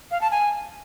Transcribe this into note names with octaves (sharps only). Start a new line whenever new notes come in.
F5
A5
G#5